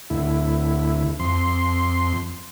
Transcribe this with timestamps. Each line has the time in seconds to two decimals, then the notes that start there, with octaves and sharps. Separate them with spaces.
0.10 D2 E4
1.20 F2 C6